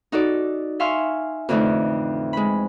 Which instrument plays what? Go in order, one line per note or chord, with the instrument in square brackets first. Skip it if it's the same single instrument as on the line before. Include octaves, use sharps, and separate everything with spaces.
[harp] D#4 F#4 A4 D5
E5 F5 G#5 C6 C#6 F6
F2 A2 D3 E3 A3 D#4
G#3 B5